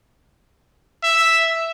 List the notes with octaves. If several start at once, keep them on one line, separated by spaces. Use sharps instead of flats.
E5